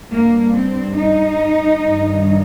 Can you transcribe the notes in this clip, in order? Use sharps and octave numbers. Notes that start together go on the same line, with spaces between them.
G2 G3 A#3
C4
D#4
G2 D#3 G3